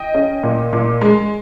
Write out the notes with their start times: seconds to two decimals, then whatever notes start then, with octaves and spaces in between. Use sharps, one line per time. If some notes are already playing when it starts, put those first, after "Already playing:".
Already playing: D#5 G5
0.14 C#4
0.43 A#2
0.73 A#2
1.01 G#3